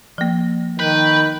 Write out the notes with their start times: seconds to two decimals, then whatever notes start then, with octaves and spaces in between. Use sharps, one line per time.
0.18 F3 A#3
0.79 D#3 B4 G5